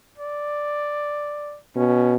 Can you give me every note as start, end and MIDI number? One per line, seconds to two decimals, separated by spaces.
0.18 1.59 74
1.76 2.17 47
1.76 2.15 61